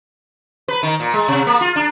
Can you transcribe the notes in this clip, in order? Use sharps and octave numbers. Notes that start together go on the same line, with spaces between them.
B4
D#3
A#2
G#3
C3
A#3
F4
D4